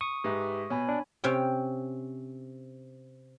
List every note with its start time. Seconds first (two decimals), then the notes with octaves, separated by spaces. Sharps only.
0.01 C#6 D#6
0.24 G#2 G4 B4 E5
0.70 B2 C#5 G#5 B5
0.89 D4
1.24 C3 C#4 G5